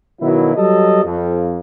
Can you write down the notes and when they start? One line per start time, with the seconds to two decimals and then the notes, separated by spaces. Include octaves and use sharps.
0.21 B2 D#3 F3 F#3 E4
0.56 F#3 G3 A4 D#5
1.04 F2